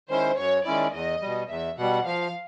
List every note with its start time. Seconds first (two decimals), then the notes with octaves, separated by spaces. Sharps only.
0.09 D#3 G#3 C#4 E4 C5
0.37 F#2 C#5
0.65 D#3 G#3 C#4 E4 D5
0.93 E2 D#5
1.22 B2 G3
1.49 E2 E5
1.78 B2 G3 F#5
2.05 F3 F5